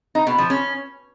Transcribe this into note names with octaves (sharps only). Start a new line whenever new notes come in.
D#4
B2
F3
C#4